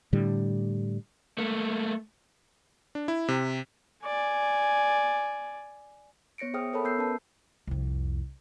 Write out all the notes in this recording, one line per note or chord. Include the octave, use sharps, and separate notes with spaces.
A2 D3 G3
A3 A#3
D4
E4
C3
D5 G#5
B3 C#5 A#6 C#7 D7
G#4 C5 E5 G5 D#6 F6
A4 A#4 C#5 E5 A5 B5
B3 E6 G6 C7
C#4 A#4 B4 A5
C2 F2